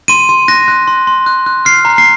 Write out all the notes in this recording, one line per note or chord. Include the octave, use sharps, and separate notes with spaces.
C6 D#7
C6
F#6 A#6
F#6
C6
C6
F#6
F#6
F6 C7
A#5
C7